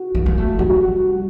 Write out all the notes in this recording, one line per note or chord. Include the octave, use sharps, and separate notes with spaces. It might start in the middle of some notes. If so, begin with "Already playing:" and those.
Already playing: F#4
A#3
A#3
A3
G3 F#4